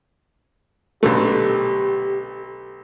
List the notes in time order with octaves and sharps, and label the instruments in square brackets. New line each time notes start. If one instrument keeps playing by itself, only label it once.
[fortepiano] B1 D3 A3 [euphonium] G4